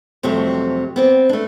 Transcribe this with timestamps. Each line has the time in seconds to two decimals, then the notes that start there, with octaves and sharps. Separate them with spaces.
0.23 F2 C3 F#3 G3 A3 C4
0.96 B3 C4 D5
1.29 A3 D4